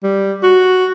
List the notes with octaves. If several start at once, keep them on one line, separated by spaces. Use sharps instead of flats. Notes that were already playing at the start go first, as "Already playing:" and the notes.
G3
F#4